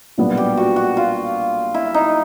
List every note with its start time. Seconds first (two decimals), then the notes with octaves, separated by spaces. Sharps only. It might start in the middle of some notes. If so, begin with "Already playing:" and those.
0.18 B1 A#2 G3 B3 D4
0.37 G4
0.57 F#4
0.76 F#4
0.97 F4
1.74 E4
1.94 D#4